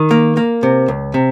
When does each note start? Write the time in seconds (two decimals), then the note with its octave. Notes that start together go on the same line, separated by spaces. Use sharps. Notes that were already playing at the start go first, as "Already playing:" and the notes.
Already playing: D#3
0.11 A#3
0.37 A#3
0.63 C3
0.88 C#2
1.14 C3